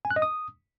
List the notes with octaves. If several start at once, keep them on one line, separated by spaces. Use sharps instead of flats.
G#5
F#6
D#5
D#6